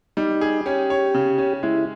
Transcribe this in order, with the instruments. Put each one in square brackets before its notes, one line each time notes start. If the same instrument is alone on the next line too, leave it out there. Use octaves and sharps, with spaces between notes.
[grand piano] G3 [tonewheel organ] D#4
[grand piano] G#4
[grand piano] C#4 [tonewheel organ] G4
[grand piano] C#5
C#3
C#4
[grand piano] G#3 [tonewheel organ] E4